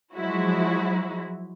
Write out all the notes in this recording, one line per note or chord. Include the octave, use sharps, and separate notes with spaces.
F3 F#3 G#3 E4 F#4